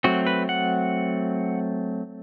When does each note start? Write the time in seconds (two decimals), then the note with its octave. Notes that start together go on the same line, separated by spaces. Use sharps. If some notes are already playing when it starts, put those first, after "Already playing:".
0.04 F#3 A3 C4 F#4
0.27 B4
0.49 F#5